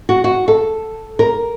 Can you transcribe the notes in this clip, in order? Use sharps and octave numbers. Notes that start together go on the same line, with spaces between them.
F#4
F#4
A4
A#4